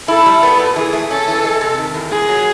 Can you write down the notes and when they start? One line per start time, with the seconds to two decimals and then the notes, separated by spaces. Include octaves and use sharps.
0.08 E4 A4
0.26 G3
0.43 B3
0.59 A#2
0.76 E3 G#4
0.93 A3
1.10 C#4 A4
1.28 E3
1.44 G#3
1.61 C3
1.78 D#3
1.94 E2
2.11 A#2 G#4
2.29 F#3